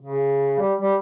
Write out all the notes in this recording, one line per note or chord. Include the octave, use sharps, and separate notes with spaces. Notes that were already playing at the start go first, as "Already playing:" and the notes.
C#3
G3
G3